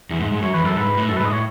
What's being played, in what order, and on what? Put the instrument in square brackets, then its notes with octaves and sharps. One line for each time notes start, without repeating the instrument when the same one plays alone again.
[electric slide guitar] E2
G#2
G#2
[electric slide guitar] F#2 [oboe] C#5
[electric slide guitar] E2 [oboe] B4
[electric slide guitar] F#2 [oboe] A4
[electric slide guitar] G#2 [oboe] B4
[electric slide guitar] G#2
A2
[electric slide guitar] F#2 [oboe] A4
[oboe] B4
[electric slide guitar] G#2
[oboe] D#5
[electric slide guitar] A2 [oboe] C#5